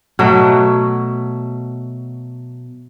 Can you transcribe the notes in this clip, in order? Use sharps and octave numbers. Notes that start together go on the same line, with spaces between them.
B2 F#3 A3